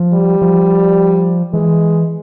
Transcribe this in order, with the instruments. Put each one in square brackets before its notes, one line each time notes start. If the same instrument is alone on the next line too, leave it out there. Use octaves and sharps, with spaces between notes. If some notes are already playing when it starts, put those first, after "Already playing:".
Already playing: [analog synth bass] F3
[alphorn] G3
[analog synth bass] F3
[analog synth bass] E3 [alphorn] G#3